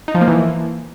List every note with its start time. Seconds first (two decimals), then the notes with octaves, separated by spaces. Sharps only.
0.08 D#4
0.15 F3
0.21 A#3
0.28 E3